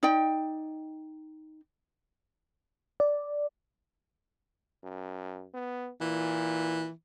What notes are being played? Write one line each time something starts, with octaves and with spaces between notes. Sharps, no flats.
D#4 D5 G5
D5
F#2
B3
A#2 E3